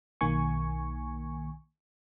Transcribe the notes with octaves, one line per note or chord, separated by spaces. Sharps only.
B1 D#3 A#3 G#5 C#6